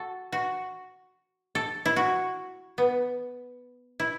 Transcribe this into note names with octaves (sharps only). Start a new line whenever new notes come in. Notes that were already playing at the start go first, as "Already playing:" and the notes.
Already playing: F#4 A4
F#4
A4
E4
F#4
B3
E4